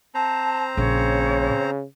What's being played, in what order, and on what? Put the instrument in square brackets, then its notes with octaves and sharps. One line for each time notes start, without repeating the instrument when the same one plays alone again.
[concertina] C4 C5 A#5 [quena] A5
[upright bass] A#1 A#2 [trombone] C#3 [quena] C#5